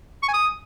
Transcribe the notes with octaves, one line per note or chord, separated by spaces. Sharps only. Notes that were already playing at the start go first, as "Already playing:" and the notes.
C#6
G#5
D#6